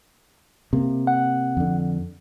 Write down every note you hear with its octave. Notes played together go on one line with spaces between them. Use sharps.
C3 A#3
F#5
F2 D3